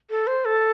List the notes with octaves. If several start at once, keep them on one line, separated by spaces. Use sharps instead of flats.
A4
C5
A4